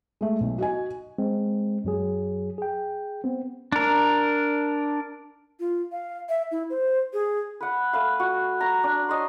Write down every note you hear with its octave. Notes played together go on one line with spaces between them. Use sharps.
G#3 A3
B1
F#4 D#5 G#5
G#3 C4
F#2 F#3 G#4
G#4 G5
B3 C4
D4 A#4
F4
F5
E5
E4
C5
G#4
B4 F#5
A3 B4 F5
F#4
A#5
D4
C#5 D#5 A#5 C6